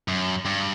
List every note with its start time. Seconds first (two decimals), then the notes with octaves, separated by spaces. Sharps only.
0.08 F#2
0.45 G2